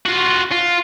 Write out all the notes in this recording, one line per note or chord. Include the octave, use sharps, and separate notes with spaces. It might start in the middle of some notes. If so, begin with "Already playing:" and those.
F4 F#4
F4